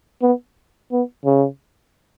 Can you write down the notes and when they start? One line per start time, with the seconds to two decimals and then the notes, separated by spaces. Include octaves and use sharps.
0.22 B3
0.92 B3
1.25 C#3